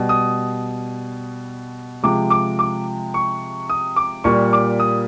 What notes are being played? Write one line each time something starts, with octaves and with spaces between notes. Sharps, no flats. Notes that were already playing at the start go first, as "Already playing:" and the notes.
Already playing: B2 G3
D#6
C3 F3 G#3 D6
D6
D6
C#6
D#6
D6
A#2 G3 C#6
D6
D#6